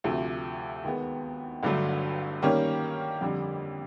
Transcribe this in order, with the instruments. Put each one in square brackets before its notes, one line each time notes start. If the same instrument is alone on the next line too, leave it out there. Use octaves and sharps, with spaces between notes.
[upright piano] D2 C3 F3 A3
D#2 D#3 G#3 B3
G1 G2 D3 F#3 A3
D#3 G3 A#3 C#4
F2 D3 G3